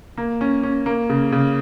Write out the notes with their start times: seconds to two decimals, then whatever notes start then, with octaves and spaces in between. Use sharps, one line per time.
0.17 A#3
0.41 C#4
0.63 C#4
0.86 A#3
1.10 C#3
1.32 C#3